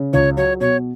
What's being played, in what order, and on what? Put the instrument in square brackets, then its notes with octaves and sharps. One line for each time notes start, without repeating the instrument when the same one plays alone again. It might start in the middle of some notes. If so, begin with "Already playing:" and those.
Already playing: [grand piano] C#3
[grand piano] C#2 [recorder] C#5
[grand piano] F#3 [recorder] C#5
[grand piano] B2 [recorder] C#5